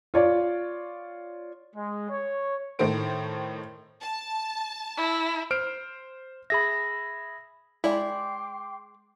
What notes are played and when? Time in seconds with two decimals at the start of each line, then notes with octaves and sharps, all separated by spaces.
0.14 F4 C#5 D5
1.75 G#3
2.09 C#5
2.79 A2 D#3 A3 C5 D7
4.02 A5
4.97 E4
5.51 C5 F6 D7
6.50 G#4 E5 B5 A#6
7.84 G#3 E4 D5 G5 B5 C6 D6